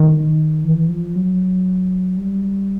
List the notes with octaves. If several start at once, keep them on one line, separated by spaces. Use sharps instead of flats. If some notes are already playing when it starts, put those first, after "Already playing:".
Already playing: D#3
E3
F3
F#3
G3